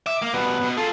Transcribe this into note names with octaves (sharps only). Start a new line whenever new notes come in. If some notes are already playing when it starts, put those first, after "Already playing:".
E5 D6
A#3
B2 G3 B3
B2
F4 G#4 A4